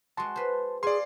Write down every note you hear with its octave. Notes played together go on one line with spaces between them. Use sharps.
G#3 F#4 A5 C6
B4 C5
G#4 D5 F5 G#5 C6